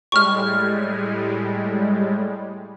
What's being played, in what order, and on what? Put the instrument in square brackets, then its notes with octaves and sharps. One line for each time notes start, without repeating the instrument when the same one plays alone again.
[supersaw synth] A2 G3 G#3 [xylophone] C#6 F6